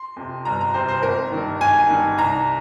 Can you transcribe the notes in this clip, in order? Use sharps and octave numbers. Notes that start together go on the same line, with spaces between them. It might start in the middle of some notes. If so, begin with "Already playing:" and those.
Already playing: C6
F2 C3
G1 A#5
A#5
F2 C3 C5
C5
G#1 A#4
G2 D#3
G#1 G#5
G2 D#3
C2 A#5